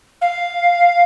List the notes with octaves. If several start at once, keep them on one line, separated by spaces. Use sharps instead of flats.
F5